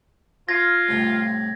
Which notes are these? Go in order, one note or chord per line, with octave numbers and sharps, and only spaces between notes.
F4 G#6 A#6
C2 A2